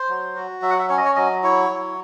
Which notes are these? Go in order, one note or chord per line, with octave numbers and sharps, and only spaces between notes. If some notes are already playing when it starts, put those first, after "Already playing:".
Already playing: C5
F#3
F#4
F#3 E5
F#5
E5
C#4 C#5
D#5
C#5
F#3 D#5
E4 C#5
F#3